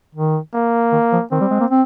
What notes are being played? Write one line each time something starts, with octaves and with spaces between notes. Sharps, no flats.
D#3
A#3
D#3
F3
D#3 C4
G3
G#3
A#3
C4